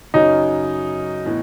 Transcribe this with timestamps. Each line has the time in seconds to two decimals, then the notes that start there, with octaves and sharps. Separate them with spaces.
0.14 F#2 C#3 F#3 C#4 D#4
1.25 A2 E3 B3